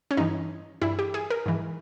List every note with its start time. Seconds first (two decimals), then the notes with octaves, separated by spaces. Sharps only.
0.11 C#4
0.17 G2 E3 D#4
0.82 G2 E3 E4
0.99 G4
1.14 G#4
1.30 A#4
1.46 G#2 E3